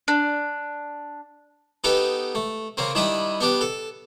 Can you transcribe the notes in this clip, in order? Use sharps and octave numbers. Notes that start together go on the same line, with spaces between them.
D4
B3 D#4 G4 A4 B4
A3
C#3 A#3 C4
D#3 G3 D4 E4 B5 D#6
B3 D4 G4
A4